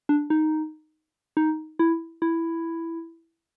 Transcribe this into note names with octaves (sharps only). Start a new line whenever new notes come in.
D4
D#4
D#4
E4
E4